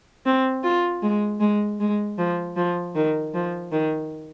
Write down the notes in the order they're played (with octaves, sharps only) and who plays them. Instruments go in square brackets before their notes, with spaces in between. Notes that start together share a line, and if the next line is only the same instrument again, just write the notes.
[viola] C4
F4
G#3
G#3
G#3
F3
F3
D#3
F3
D#3